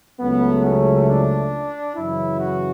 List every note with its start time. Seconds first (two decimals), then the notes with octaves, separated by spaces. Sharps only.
0.19 C#2 C#3 F#3 A3 B3
0.64 C#4
1.08 D4
1.96 F#2 C#3 E3 E4
2.40 F#4